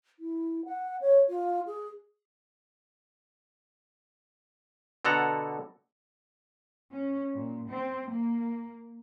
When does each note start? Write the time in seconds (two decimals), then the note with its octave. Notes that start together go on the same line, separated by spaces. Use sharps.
0.19 E4
0.65 F#5
1.01 C#5
1.29 F4
1.67 G#4
5.05 B2 D3 A4 F#5 A#5
6.92 C#4
7.34 A#2
7.69 C4
8.09 A#3